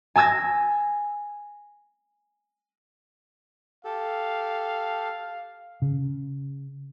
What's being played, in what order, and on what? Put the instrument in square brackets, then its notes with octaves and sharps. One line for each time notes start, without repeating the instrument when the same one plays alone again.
[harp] G#5 A5 E6 G#6 A#6
[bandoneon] G4 A4 [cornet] F5
[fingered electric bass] C#3